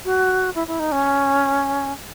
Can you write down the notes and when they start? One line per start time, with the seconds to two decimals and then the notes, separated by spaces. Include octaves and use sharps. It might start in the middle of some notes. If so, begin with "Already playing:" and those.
0.05 F#4
0.55 E4
0.67 E4
0.80 D#4
0.92 C#4